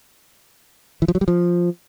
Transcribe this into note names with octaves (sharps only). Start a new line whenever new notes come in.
E3
F3
F#3
G3
F3